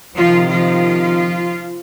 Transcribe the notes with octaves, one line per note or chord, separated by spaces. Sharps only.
C3 D#3 F3 F4
F3 F4